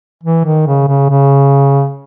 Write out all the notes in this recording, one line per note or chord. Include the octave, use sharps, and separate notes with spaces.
E3
D#3
C#3
C#3
C#3